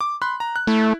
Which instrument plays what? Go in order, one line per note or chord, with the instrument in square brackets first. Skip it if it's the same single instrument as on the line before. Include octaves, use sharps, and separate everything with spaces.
[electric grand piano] D6
B5 C6 F#6
A#5
F#6
[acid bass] A3 [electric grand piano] E4